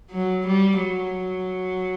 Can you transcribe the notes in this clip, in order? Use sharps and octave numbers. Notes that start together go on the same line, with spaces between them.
F#3
G3
F#3